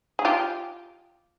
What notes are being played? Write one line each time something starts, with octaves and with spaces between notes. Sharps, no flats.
G#4
F4 G4